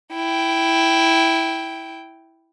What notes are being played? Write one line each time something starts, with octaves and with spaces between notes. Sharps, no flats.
E4 G5